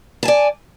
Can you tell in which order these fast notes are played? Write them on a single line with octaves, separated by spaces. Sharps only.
A5 G#5 D5